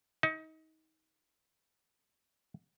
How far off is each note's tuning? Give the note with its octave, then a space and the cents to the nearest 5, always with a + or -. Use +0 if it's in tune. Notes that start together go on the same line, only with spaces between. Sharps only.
D#4 +30